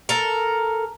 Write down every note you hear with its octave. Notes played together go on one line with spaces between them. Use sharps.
A4 A#4